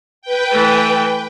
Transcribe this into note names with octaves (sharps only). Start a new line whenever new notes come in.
B4 G5
E3 A3